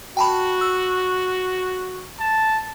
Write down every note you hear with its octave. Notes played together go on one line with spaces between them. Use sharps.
F#4 G5 A5 B5
E6
A5